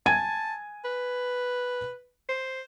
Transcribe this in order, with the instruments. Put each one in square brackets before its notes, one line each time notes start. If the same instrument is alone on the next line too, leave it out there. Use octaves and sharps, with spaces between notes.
[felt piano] G#5 G#6 D#7 [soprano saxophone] A5
[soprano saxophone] B4
C5